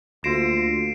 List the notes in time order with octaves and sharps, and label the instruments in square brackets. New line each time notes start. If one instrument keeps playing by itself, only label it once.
[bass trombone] D2 [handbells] A#3 F4 A#6 [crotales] C7 D7 E7